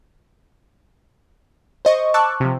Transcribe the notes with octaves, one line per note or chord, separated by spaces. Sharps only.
C5 D#5 C#6
A5 C#6 D6 E6 F#6
C3 F3